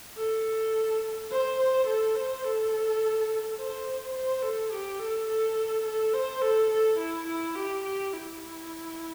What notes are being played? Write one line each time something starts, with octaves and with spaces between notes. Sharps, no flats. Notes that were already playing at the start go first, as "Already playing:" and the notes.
A4
C5
C5
A4
C5
A4
C5
C5
A4
G4
A4
A4
A4
C5
A4
A4
E4
E4
G4
G4
E4